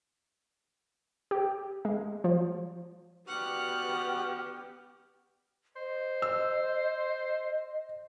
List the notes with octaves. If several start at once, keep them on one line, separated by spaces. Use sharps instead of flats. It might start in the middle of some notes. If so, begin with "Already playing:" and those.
G4
G#3
F3
B3 F#4 G4 D5 F#5 F6
C5 D#5
E6